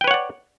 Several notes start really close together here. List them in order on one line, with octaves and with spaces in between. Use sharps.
G5 B4 C#5 F#5 D5